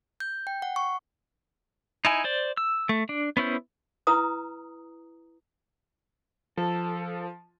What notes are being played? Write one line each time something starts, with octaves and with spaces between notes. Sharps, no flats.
G6
G5
F#5
C#6
D#4 E4 G#5
C5 D5
E6
A3
D4
B3 C#4 E4 C5
E4 B4 A#5 D#6
F3 A4